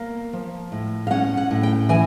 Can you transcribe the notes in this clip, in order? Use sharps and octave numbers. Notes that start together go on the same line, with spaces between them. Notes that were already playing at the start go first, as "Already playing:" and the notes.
Already playing: A#3
F3
A2
F5
C#4 F#5
F#5
A2
G5
E3 G#5